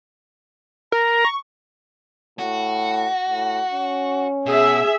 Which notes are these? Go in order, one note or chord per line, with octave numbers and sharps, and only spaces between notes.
A#4 A#5
C#6
A2 F#4
A2
C#4
B2 G#4 E5